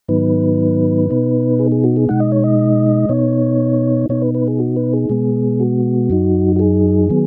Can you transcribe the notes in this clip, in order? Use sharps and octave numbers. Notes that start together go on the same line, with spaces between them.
G#2 D#3 F#3 B3 D#4 B4
B2 B3 D#4
G#4
G#4
F#4
G#4
B2 G#3 D#4 F#5
D#5
C#5
D#5
B2 B3 D#4 C#5
B2 B3 D#4 C#5
B4
B4
G#4
F#4
B4
G#4
B2 G#3 B3
F#4
F#2 F#3 D#4
F#4
G#4
D#3 F#3 B3